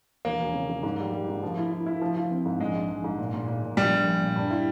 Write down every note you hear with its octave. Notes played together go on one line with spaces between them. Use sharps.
E1 A#3
E1
C#3
C#3
G#2
G3
G3
G#2
F3
E4
E4
E4
F3
F3
C4
G#2
A#1 G#3
A#1
A#1
G#2
A#2
A#2
A#2
A#2
A#1 G3
A#1
A#1
A#2
G2
E4